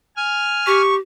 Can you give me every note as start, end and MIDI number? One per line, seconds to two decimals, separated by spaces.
0.17 0.82 80
0.17 0.82 89
0.67 0.98 67
0.67 0.95 85